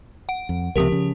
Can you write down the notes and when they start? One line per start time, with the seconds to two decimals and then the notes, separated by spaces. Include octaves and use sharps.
0.29 F#5 D7
0.49 F2
0.76 C#2 C3 F3 G4 A#4
0.92 C#3